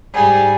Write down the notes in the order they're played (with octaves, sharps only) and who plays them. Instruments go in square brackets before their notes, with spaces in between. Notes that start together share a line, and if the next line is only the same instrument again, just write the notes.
[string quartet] G#2 G3 G#4